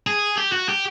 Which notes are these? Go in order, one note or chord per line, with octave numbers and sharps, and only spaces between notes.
G#4
G4
F#4
G4